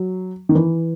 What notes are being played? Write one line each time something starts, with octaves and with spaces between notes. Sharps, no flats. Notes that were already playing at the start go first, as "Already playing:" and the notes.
Already playing: F#3
D#3
E3